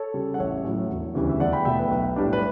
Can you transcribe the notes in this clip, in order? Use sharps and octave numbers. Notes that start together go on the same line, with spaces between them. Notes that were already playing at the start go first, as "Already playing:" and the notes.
Already playing: A4 C#5
C#3 G3
F#5
A1 C#5 E5
A2 F#3
E1
D2 C#3 E3 G3
E5
E2 D5 F#5
G5 B5
B2 A3 E5 G5
B4
B1 B4
A2 G3 D4
B4